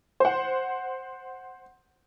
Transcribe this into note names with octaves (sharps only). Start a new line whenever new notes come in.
C5 F#5